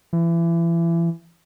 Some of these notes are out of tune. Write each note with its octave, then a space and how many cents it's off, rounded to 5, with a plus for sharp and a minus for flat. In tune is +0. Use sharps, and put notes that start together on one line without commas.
E3 +30